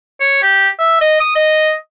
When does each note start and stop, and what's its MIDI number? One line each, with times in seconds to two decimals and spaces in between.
0.20 0.40 73
0.43 0.69 67
0.80 1.00 76
1.01 1.17 75
1.20 1.32 87
1.36 1.74 75